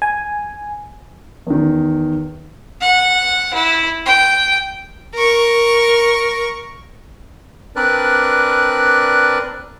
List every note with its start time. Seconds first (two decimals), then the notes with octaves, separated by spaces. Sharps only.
0.02 G#5
1.47 E2 D#3
2.81 F#5
3.54 E4
4.06 G5
5.14 A#4 C#6
7.76 C4 D4 A#4 B4 D5 F#6